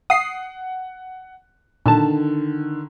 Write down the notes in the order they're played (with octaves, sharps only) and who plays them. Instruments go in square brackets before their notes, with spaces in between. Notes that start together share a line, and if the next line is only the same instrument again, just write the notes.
[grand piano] F#5 [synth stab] D#6 C7
[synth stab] A#2 A5 [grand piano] D3 D#3